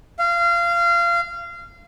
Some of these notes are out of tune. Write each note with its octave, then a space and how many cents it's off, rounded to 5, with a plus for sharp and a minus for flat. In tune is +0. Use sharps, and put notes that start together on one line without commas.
F5 -25